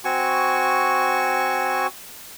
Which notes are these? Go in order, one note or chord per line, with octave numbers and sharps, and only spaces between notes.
C4 F#4 G#5 C#6